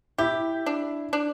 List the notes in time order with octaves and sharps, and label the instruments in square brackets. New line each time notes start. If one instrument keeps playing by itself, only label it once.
[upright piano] E4 [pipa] G4
[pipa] D4
D4